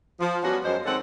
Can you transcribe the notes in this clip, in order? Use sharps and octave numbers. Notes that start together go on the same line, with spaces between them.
F3
F3 G3 B3 C#4 F#4
F#2 G#3 C5
D#3 G#3 C4 A4 C#5 F#5